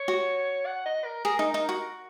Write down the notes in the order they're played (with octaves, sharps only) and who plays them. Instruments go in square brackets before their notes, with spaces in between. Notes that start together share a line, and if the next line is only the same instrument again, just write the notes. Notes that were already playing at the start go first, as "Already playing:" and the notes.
Already playing: [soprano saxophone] C#5
[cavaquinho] F#4
[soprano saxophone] F#5
D#5
A#4
[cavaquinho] G#4 [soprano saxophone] A#4
[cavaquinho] D#4
D#4
F#4